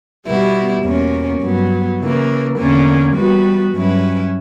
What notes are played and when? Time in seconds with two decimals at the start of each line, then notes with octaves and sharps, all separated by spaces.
0.24 B2 G3 B3 E4
0.82 E2 B2 A#3 C#4
1.41 G2 F#3 B3
1.99 C#3 E3 A#3
2.56 E2 D3 A#3 C#4
3.15 E3 G3 B3 F#4 B4
3.73 G2 F#3 C#4 E4 B4